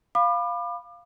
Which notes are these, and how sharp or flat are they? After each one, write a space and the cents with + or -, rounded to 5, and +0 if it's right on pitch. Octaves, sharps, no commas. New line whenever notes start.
F5 +0 B5 +0 D6 +35